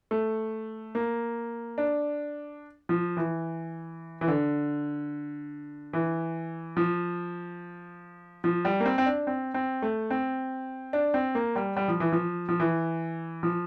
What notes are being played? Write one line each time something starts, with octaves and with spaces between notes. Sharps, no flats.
A3
A#3
D4
F3
E3
E3
D3
E3
F3
F3
G3
A#3
C4
C4
D4
C4
C4
A3
C4
D4
C4
A#3
G3
G3
F3
E3
F3
F3
E3
F3